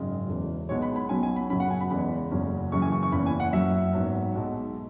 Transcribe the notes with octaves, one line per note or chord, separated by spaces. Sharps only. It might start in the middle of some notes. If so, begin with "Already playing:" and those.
Already playing: G#1 F#2 C#3 G#3
E1 E2 E3
B1 B2 G#3 B3 C#5
B5
B5
B1 B2 F#3 C#4 G#5
G#5
B5
F#2 C#3 F#3 C#4 B5
F#5
G#5
B5
E2 C#3 E3 G#3 B3 B5
F#1 E2 C#3 F#3 C#4
F#2 C#3 E3 C#6
G#5
C#6
C#6
F#1 E2 E3 C#4 B5
G#5
F#5
F#1 F#2 F#3 E5
G#1 G#2 F#3 B3
B1 B2 G#3